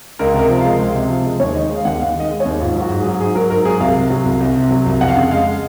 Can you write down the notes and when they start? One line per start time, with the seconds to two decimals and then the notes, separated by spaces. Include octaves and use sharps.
0.19 C#2 A#4
0.34 C3 A#4
0.49 F3
0.59 F5
0.64 G#3
0.79 C#2
0.95 C3
1.10 F3
1.25 G#3
1.40 D#2 C#5
1.55 D#3 D#5
1.69 G#3
1.76 F5
1.85 D#2 F#5
2.00 D#2 F5
2.15 D#3 D#5
2.30 G#3
2.40 C#5
2.46 D#2
2.60 G#2 F4
2.75 F#3 F#4
2.90 G#2
3.00 G#4
3.05 F#3
3.20 G#2 G#4
3.35 F#3 A#4
3.50 G#2 A#4
3.65 F#3 G#4
3.80 C2 F5
3.95 C3
4.10 F#3
4.25 C2
4.41 C2
4.56 C3
4.71 F#3
4.86 C2
5.01 F2 F#5
5.08 F5
5.15 C#3 F#5
5.31 G#3 F5